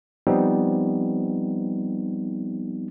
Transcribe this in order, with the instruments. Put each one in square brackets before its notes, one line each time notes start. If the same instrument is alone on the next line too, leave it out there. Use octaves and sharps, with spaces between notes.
[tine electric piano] F3 G3 B3 C4 D#4